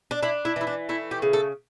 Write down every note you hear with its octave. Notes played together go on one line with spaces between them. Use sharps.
D4
D4 E4
E4
E3 E4
D4
A3 E4
G4
C#3
A4